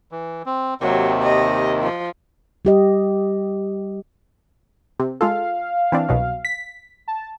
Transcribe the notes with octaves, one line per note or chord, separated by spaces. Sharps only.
E3
C4
D#2 C3 D#3 F#3
D#5
F3
G3 G4 D#5
C3
G#3 F4 A4 F5
E3 C4 D4
C2 B2 F#3
B6
A5